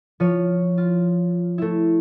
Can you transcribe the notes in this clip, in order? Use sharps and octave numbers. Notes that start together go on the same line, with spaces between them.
F3 C#5 D#7
F4
A3 E4